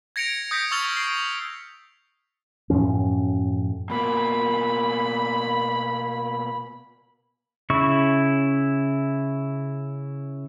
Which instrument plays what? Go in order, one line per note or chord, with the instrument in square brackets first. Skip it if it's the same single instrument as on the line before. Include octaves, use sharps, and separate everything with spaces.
[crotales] G#6 A#6 C#7 D7 F7
D#6 G6 A#6 B6 D7
C#6 E6 F6 A6 F7 G7
C7 D7
[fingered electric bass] F#2 A2 F3 C#4
[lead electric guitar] B2 A#3 [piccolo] B5
[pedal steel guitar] C#3 E4 C#6